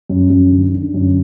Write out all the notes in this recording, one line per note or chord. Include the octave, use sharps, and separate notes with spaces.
F#2
F#2
D3
D3
F#2